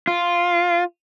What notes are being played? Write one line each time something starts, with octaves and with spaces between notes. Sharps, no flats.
F4